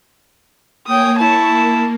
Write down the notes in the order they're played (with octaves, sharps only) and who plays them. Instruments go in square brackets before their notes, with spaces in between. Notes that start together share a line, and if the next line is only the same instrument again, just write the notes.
[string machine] A#3 C#5 G#5 [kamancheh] G5 D#6
[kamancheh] E4 A5 [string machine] C#6
[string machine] A#3